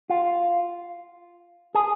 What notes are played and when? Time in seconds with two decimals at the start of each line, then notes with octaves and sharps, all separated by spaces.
0.10 F4
1.75 G#4